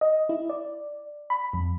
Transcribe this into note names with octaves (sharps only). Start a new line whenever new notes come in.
D#5
E4
D5
B5
F2